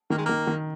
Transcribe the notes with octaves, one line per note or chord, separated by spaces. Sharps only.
D#3 A#3
G#3
D#3 A#3
D#3